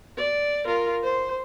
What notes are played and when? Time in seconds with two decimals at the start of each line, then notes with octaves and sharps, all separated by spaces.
0.18 D5
0.66 F4 A#4
1.04 C5